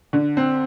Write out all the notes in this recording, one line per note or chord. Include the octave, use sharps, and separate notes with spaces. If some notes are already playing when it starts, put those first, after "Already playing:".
D3
C4